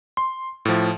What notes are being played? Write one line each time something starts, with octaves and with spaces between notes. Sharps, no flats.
C6
A2 F3